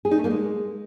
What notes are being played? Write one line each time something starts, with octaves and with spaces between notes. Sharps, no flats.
G#4
D#4
A3
A#3
G#3